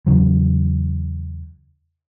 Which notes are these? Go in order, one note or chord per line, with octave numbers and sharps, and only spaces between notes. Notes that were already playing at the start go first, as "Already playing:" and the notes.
E2 C#3 F#3